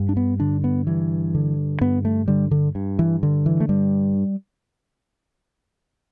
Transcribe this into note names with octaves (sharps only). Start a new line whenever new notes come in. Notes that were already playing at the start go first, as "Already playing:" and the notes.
Already playing: G2
D4
B3
D3 D4
B3
G2 E3
D3
G2 B3
A3
D3 G3
D3
G2
E3
D3
E3
A3
G2 G3